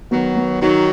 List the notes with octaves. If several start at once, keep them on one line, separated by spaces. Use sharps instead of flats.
D#3 F#3 B3
B3
D#3 F#3 D#4